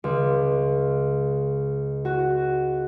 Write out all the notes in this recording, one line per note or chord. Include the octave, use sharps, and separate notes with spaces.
C#2
F#4